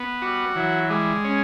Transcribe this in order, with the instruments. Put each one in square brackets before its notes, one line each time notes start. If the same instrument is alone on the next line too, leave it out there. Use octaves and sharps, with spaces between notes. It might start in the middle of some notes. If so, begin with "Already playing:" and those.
Already playing: [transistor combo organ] B3
[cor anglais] G3 [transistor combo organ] F#4
[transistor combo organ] E3 [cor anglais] F#3
[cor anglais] G3 [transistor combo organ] G#3
[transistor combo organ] C#4